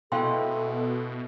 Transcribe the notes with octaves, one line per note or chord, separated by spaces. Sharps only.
B2 G#3 A3 E4 A4 F5 G5 C6